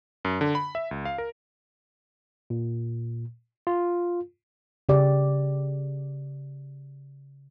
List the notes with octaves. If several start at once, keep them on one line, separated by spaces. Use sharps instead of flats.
F#2
D3
B5
E5
C#2
F5
A#4
A#2
F4
C#3 G4 D5